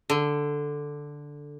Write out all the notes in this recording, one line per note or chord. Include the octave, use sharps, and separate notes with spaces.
D3